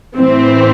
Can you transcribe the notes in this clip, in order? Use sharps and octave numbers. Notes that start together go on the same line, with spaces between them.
A2 E3 C4